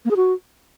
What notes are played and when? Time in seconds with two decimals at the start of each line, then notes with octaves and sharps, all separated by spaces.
0.05 A#3
0.11 G#4
0.16 F#4